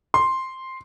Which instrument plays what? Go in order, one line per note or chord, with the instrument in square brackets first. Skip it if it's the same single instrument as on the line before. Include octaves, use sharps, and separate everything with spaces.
[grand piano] C6